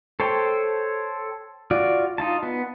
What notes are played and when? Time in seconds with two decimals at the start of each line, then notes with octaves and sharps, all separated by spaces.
0.20 A4 C5 C#5 G5
1.71 F4 F#4 D5
2.18 D#4 F4 A5
2.43 B3